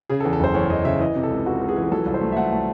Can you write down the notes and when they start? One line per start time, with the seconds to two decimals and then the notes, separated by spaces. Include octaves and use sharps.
0.10 C#3 G#4
0.20 A4
0.25 E2
0.33 A4
0.40 F#1 C5
0.54 E2 C#5
0.69 F#1 D#5
0.85 C#3 E5
1.00 E3 D#5
1.16 C3
1.24 A4
1.31 C#2
1.46 C#2 F#4
1.61 C#2
1.68 G#4
1.76 E3
1.91 F#3 A4
2.06 C2
2.14 C5
2.21 A3
2.32 E5
2.37 A3 F#5
2.52 A3